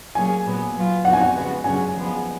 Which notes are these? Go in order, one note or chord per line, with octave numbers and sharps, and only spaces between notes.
F#3 A#3 C#4 G#4 G#5
A#2 F#3 B3
F#3 B3 F4
F2 F3 B3 D#4 F#4 F#5
G#5
F#5
C#3 F3 G#3 B3 F#4
F#2 C#3 F#3 C#4 G#4 G#5
F3 G#3 B3